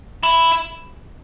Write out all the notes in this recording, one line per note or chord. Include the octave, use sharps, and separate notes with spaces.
E4